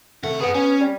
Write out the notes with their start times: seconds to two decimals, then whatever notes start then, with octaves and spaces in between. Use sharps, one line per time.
0.23 C3 A3 F#5
0.41 B3 G#4 F#5
0.55 C#4
0.81 G3